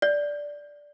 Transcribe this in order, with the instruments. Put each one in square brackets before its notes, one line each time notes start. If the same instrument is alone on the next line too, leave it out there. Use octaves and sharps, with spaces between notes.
[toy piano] D5